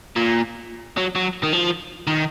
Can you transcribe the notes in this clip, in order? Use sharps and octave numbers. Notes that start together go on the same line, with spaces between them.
A#2
F#3
F#3
D#3
F3
D#3